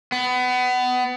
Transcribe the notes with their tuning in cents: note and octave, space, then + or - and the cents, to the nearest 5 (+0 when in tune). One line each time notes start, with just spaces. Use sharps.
B3 +25